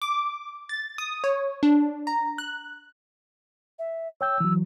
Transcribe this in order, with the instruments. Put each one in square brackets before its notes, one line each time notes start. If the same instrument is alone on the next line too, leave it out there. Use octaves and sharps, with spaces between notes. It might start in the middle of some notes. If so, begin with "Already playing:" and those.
[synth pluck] D6
A6
D#6
C#5
D4
A#5
F#6
[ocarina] E5
[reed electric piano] C#5 G5 G6 [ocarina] E6
[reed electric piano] E3 F#3